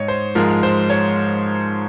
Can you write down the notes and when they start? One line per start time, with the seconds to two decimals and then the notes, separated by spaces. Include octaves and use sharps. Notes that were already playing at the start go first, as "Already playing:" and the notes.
Already playing: G#2 C#5 D#5
0.08 C5
0.35 G#2 F3 G#3 A#4
0.63 C5
0.90 C#5